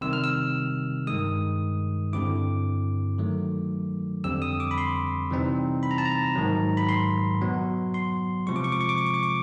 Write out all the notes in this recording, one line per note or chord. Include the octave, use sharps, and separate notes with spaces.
C3 D#3 G3 E6
F6
E6
G2 D#3 G#3 D#6
G2 D3 G3 C4 E4 D6
D#3 F#3 A3
F2 D3 G3 C4 E6
D#6
D6
B5
C6
C3 E3 G3 C4 D#4
B5
A#5
A5
A#5
G#2 D#3 F#3
B5
C6
B2 F#3 B3
C6
C3 F3 G#3 C#6
D6
C#6
D6
C#6
D6
C#6
D6
C#6
D6